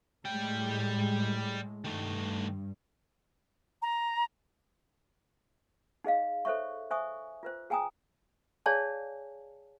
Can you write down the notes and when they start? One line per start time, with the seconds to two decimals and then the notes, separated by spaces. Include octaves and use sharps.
0.25 A2 G3 G#3 G5
1.84 G2 D#3 A3
3.82 A#5
6.04 D#4 G#4 D#5 F5
6.45 A4 C5 C#5 E5 C#6
6.91 C5 E5 G#5 C#6 D#6
7.43 F4 B4 C5
7.70 G#4 G5 G#5 A#5 D#6
8.66 G#4 C#5 D5 F5 G#5 A5